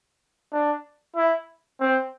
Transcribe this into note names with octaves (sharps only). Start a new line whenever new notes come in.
D4
E4
C4